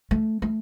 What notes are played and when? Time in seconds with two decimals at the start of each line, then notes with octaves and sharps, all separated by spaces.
0.11 A3
0.42 A3